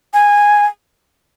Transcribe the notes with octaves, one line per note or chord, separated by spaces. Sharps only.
G#5